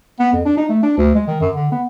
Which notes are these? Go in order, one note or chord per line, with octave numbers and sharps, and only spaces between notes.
B3
F2
D4
D#4
A3
D4
D2
G#3
D#3
F#2
D3
B3